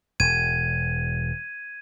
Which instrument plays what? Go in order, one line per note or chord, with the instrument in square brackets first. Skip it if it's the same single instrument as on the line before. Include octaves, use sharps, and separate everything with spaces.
[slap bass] E1 [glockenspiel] G#6 D#7